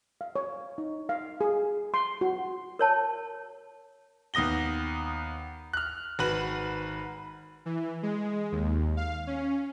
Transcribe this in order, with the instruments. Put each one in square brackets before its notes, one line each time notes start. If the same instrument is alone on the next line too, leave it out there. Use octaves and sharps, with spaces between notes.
[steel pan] F5
C#5
D#4
F5
G#4
C6
F#4
[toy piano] A#4 C#5 A5
[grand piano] D#2 B3 D#6 A#6 G7
F6 F#6
G#1 F#4 B4 F#7
[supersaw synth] E3
G#3
D#2
F5
C#4